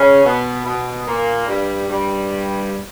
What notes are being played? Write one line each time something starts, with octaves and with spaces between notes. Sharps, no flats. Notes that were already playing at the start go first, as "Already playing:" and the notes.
Already playing: C#3 C#4
B2 B3
B2 B3
A#2 A#3
G2 G3
G2 G3